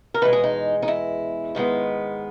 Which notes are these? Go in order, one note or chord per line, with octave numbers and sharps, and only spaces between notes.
A#4
E2 B2 G#3 B4
G#4
D#4
D#4
E4
G#2 D#3 G#3 B3